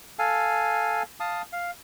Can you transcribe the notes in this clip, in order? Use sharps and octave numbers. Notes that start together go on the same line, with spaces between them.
A4 F5 G#5
F5 A5 D#6
F5